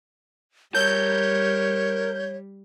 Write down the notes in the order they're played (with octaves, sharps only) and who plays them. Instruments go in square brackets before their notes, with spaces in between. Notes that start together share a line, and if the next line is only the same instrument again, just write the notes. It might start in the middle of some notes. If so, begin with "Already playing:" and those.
[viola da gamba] G3 [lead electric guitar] A#4 A5 [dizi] C#5 [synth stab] G6